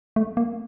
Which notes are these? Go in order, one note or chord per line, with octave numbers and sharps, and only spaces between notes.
A3
A#3